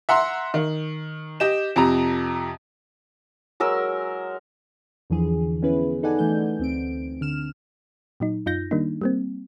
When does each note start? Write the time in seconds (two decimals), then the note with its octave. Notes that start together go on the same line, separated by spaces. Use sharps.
0.09 E5 F#5 A#5 C6
0.54 D#3
1.40 G4 D#5 E7
1.76 F2 C3 A#5
3.60 F#3 G#3 A#4 E6
5.10 E2 D3 E3 F3 G#4
5.62 B3 C#4 E4 G#4 B4
6.03 D#4 A4 B4 D5 F#5 G#5
6.19 E3 A3 G6
6.59 D2 C4 D7
7.21 D3 F6 E7
8.20 A#2 F#3 D#4
8.46 F#2 D#4 F4 G6 A#6
8.71 D#3 G3 A#3 D4 D#4
9.02 G3 A#3 C4